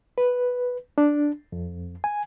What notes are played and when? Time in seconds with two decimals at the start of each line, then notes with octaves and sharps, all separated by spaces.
0.18 B4
0.98 D4
1.52 F2
2.04 G#5